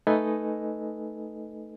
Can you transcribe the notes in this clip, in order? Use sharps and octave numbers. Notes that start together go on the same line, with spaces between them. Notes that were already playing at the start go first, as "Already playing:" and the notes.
A3 D#4 A4 B4 D#5 G#5